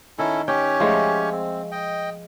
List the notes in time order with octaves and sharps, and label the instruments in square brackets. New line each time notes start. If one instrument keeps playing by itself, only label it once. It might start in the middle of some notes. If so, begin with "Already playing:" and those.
[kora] D#3 [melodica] C#4 E4 A4
[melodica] C#4 G4 C#5 [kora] G5
[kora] F3 G#3 A3
[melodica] C4
D#5 G5